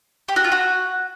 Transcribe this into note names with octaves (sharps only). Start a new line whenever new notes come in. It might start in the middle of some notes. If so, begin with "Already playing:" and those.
G4
F#4
F4
F#4